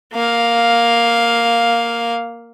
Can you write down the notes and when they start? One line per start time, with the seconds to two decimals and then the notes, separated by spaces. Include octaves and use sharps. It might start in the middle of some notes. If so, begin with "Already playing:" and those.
0.13 A#3 F5